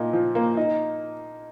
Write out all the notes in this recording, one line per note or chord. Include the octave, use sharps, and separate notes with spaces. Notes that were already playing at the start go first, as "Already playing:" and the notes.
Already playing: A#2 D#4
F3
A#3
D#4